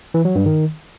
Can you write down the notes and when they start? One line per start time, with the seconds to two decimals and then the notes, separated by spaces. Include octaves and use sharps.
0.14 E3
0.25 F#3
0.35 G2
0.46 D#3